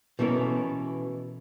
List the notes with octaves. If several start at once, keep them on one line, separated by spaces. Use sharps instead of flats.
B2 E3 A3 C#4 A#4